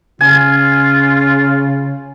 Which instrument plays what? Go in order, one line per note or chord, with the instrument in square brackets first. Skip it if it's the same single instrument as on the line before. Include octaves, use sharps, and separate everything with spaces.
[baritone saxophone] C#3 [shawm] F4 [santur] G#5